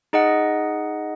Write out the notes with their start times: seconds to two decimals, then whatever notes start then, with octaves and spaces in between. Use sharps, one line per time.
0.13 D#4 G#4 D#5 F#5